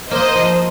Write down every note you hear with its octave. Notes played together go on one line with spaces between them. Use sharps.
A#3 C5 D#5
F3